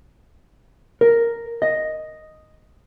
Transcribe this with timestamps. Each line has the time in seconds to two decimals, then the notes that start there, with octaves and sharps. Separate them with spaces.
1.01 A#4
1.62 D#5